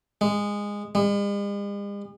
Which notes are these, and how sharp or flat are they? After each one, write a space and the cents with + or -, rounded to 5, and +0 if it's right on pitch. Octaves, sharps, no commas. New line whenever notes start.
G#3 -15
G#3 -45